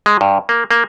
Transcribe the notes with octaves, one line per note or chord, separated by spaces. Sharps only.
G#3
G2
A#3
A#3